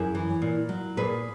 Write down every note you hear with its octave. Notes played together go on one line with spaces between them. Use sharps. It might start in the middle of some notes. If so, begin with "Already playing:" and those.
Already playing: F#2 E4 G#4
E3
A#2
F#3
A#2 G#4 B4